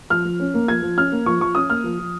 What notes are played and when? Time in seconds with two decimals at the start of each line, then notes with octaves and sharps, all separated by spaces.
0.10 F3 F6
0.25 F3
0.40 C#4
0.54 A#3
0.68 F3 G#6
0.82 F3
0.97 C#4 F6
1.12 A#3
1.26 F3 C#6
1.40 F3 C#6
1.55 C#4 D#6
1.70 A#3 F6
1.84 F3
1.99 F3